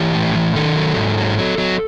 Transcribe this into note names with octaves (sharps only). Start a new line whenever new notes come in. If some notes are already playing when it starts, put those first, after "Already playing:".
Already playing: E3 G4
A2
E3
D#3 A4
F#3
G#2
F#3
F#3
F#3